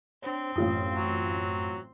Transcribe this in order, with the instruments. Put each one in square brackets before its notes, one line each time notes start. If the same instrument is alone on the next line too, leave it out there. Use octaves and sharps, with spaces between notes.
[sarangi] C4 [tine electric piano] D4 C5 C#5
[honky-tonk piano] A1 F4 D#6 [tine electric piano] F#2
[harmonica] F#3